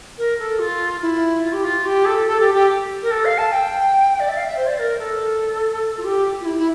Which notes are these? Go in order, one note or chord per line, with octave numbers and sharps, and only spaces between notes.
A#4
A4
F4
E4
F4
G4
F4
G4
A4
A4
G4
G4
A#4
A4
F5
A5
G5
D5
E5
F5
E5
C5
D5
A#4
A4
F4
G4
F4
E4
E4